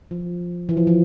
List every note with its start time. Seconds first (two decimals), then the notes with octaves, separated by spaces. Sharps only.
0.11 F3
0.69 E3
0.77 F3
0.87 F3